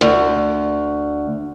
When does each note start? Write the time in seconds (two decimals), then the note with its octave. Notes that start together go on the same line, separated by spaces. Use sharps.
0.01 D2